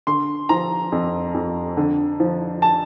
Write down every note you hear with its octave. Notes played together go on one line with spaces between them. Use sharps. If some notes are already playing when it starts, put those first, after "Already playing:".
D3 C6
F3 A#5
F2
F2
D3
F3
A5